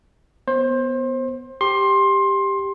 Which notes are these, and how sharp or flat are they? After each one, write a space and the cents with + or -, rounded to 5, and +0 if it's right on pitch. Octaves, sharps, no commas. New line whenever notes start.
B3 +0 C5 +25
G4 +5 C6 +20